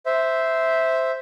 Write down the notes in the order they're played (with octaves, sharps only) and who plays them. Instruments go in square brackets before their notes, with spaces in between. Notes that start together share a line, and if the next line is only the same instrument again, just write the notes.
[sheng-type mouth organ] C5 E5